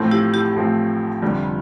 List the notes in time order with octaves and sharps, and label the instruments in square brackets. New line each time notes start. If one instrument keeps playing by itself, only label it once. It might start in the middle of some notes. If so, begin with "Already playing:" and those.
Already playing: [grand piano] A1 A2 F3 A3 C4
[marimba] E4 G4
E4 G4
[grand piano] A1 A2 F3 A3 C4
F1 F2 D3 G3